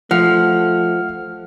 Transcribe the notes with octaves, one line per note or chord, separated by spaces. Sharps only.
F3 A3 F#5 F6